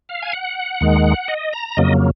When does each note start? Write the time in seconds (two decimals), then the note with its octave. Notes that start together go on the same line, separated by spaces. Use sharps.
0.09 F5
0.22 G#5
0.33 F#5
0.81 D#2 D#3 G#3
1.28 D#5
1.53 A#5
1.77 F2 C#3 F#3 A#3 D#5